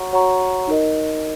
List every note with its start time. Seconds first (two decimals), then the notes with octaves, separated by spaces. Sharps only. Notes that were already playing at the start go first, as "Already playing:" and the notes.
Already playing: F#4 C#5 F#5 A#5 C#6
0.13 F#4 C#5 F#5 A#5 C#6
0.67 D#4 A#4 D#5